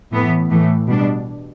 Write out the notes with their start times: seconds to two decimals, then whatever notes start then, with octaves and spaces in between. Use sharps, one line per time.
0.13 A2 E3 B3
0.50 A2 E3 A3
0.88 B2 G3 D4